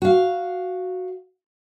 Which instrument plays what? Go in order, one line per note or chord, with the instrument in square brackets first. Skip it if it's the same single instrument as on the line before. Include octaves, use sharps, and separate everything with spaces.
[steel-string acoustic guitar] F#4 F5